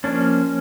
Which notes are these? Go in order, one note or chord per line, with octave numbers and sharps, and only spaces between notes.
F3 A#3 C#4 D4